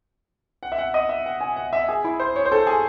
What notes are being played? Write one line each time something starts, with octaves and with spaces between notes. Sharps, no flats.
F#5
E5
F#5
D#5
E5
F#5
G#5
F#5
E5
G#4
E4
C5
C#5
C5
A4
G#4